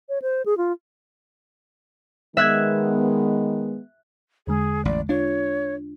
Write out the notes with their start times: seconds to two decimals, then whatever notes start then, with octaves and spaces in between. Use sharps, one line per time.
0.09 C#5
0.22 C5
0.46 G#4
0.57 F4
2.37 D#3 G#3 B3 E5 F#6 G#6
4.47 E2 D3 G#3 G#4
4.85 A1 D5
5.09 D4 F4 C#5